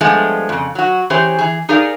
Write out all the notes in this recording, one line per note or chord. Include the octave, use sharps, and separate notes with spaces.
G2 F3 G#3 A3 B3
F2 C#3
F#3 F#4
E3 C#4 G4 G#4 C5 C#5
E3 G#4
D#4 G#4 A#4 D5 F5